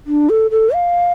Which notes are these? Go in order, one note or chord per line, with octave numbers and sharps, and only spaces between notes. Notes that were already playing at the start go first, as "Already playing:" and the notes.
D4
A4
A4
F5